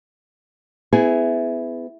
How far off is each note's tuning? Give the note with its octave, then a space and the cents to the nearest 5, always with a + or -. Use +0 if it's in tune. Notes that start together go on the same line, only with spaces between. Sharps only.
B3 +30 E4 +0 G#4 +0